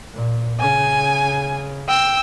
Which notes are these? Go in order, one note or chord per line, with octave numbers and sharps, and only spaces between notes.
A#2
C#3 G#5
G5 E6